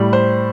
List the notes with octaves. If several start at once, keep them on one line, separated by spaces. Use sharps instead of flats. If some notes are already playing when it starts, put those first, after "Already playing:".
Already playing: A2 G3
C5